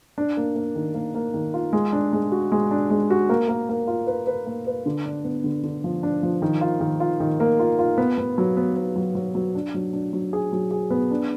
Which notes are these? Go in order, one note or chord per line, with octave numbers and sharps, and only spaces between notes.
D4
A#3
A#3
D#3
A#3
A#3
D#3
F4
G#3
D4
G#3
F#4
G#3
D4
G#3
F#4
A#3
A#3
A#3
F4
B4
B4
A#3
B4
D3
D4
B3
D3
D3
F3
D4
F3
D#3
F4
D#3
F4
D#3
A#3
F4
F4
B3
B3
F#3
B3
B3
F#3
F#3
F#3
D4
F#3
D4
F#3
G#4
F#3
G#4
B3
D4